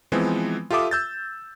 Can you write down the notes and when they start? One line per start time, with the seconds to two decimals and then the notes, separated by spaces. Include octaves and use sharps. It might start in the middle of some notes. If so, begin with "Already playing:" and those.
0.12 E3 F3 G#3 B3 C4
0.70 F4 G4 A4 E5 D6 D#6
0.91 E6 G6 A6